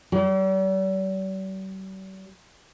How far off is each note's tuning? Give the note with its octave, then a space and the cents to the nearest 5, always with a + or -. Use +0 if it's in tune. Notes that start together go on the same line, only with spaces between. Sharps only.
G3 -45